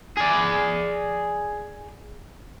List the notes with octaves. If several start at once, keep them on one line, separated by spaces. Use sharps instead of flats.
G#4 D5